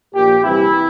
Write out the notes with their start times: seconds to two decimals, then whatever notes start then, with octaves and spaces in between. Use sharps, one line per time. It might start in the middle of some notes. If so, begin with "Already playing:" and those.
0.15 A#1 A#2 G4
0.43 C2 C3 E3 E4